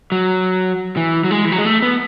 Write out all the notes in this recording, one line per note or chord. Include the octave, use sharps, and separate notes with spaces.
F#3
E3
F#3
G#3
E3
F#3
G#3
A3
B3